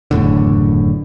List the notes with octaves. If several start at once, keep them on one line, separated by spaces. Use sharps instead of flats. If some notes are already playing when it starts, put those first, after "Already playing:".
F#1 E2 A2 D3